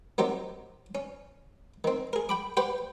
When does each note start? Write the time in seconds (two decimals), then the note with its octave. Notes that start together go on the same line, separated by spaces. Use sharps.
0.18 D#3 F#3 C4 G4
0.95 C#4
1.84 D#3 C4
2.13 G#4 A#4
2.29 G5 B5 D6
2.57 G4 B4 C5 F#5 G5